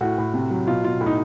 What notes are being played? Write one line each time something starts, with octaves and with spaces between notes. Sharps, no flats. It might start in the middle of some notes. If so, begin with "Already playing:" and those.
A2 F#4
A2
C3
F#3
B2 F4
B2 F4
A2
D#4